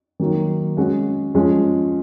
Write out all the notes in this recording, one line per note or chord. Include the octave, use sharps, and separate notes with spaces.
D#3 F#3 A#3
G#3 C#4 F#4
F3 G#3 C#4